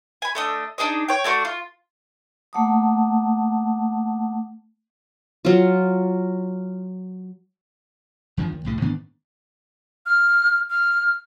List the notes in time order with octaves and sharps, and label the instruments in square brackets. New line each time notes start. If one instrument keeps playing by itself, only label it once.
[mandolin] G#5 B5
A3 D4 D#5
D4 D#4 G#4 D#5
C#5 G5
A3 D4 F#4 C#6
F4
[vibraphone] A3 A#3 F#5 A5 D6 D#6
[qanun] F#3 F4
[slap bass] E2 G2 D#3 F3
D#2
C2 A2 G3
G#2 D#3 B3 D4
[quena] F6
F6